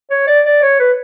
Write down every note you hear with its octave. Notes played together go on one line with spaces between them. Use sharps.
C#5
D5
D5
C#5
B4